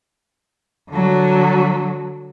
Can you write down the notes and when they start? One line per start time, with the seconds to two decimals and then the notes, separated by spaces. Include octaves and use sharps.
0.91 D3 F#3